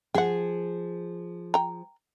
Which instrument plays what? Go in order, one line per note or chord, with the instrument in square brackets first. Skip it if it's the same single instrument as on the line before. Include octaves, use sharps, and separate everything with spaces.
[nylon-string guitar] F3 G#4 [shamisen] F#5 G5
[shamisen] G5 A#5